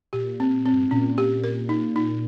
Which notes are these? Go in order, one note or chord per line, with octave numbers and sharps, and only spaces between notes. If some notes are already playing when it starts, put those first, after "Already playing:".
A#2 G4
C4
C4
G2
G#2
A#2 C#4
G4
A#4
D#4
D#4